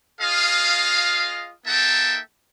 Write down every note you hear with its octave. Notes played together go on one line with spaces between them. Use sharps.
F4 G#4 D#5 F5
A#3 D#4 A4 E5 G5 A5